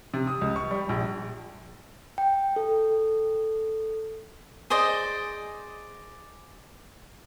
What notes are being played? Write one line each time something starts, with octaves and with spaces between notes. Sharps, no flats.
C3
D#6
C#2
C#6
G3
A#1
G5
A4
G#4 C5 D5 D#5